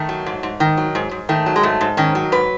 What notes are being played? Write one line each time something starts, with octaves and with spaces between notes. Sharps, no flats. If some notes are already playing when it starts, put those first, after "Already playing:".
Already playing: D#3 A3
F#3
G#2
G#2
D#3
F#3
G#2
G#2
D#3 A3
F#3
G#3
G#2 A3
G#2
D#3 C#4
F#3
G#2 B4